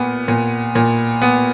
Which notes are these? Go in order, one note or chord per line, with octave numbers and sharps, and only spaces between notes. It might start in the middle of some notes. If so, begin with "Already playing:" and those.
Already playing: A#2 B3
A#2
A#2
B3